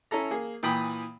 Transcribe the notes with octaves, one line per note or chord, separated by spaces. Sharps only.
C#4 E4 A4 A#5
A#3 G#4
A#2 E3 G5 B5 D#6